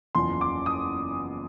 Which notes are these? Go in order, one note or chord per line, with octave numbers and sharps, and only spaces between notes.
F#1 E2 C#3 F3 C6
D6
D#6